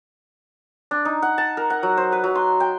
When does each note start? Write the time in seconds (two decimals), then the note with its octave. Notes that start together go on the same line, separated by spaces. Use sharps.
0.91 D4
1.05 D#4
1.22 F#5
1.38 A5
1.57 A#4
1.70 F#5
1.83 F#3
1.97 C5
2.12 B4
2.24 F#3
2.35 C6
2.60 G5